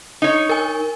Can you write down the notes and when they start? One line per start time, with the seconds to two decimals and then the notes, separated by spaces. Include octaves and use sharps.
0.22 D#4 C#5
0.49 A#4 G#5